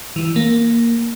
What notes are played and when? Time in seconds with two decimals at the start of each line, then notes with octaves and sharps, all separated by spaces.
0.16 E3
0.36 A#3